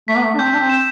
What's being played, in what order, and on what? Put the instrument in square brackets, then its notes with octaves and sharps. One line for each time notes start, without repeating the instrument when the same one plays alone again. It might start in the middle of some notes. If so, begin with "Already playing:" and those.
[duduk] A3 [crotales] B6
[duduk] B3
A3
D4
[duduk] C4 [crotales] G6
[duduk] D4
C4
[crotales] E7